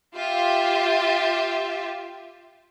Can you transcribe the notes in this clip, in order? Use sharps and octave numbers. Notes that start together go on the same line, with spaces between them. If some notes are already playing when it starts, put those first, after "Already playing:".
F4 G4 E5